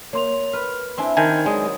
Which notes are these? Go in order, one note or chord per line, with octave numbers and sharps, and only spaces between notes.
A#3 C#5 C6 F7
B4 F6
C4 D4 E4 G#5 B5 C6
D#3 G#5 A5 F6 G6
F#3 G#3 D5 D#6